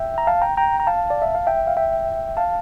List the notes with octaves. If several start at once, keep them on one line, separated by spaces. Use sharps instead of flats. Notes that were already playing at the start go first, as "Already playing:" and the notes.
Already playing: E5 G5
A#5
F5 A5
G5 A#5
G5 A#5
A#5
F5 A5
D5
E5
F5
E5 G5
F5
E5 G5
F5 A5